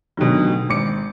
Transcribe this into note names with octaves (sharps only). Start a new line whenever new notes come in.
A1 B2 D3 D#3 F#3
G#1 D6 C#7